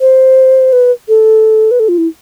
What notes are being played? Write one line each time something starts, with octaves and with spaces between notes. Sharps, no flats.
C5
B4
A4
B4
A4
F4
E4